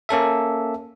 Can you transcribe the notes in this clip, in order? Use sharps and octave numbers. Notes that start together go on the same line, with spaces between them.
A#3 C#4 A4 E5